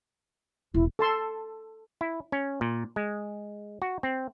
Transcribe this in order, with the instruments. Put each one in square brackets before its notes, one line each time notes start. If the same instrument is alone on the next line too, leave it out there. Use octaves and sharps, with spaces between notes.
[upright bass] E1 [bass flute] E4
[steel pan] A4 A5 C6 E6
[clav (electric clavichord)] E4
C#4
A#2
G#3
F#4
C4